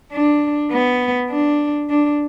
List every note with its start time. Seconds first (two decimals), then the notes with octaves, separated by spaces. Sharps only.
0.13 D4
0.71 B3
1.31 D4
1.90 D4